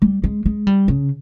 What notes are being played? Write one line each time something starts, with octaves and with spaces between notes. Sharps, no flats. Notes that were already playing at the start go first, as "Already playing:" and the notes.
G3
G#3
G#3
G3
C#3